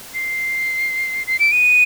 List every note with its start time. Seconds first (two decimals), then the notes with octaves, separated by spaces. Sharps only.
0.14 C7
1.27 C7
1.39 D7
1.52 D#7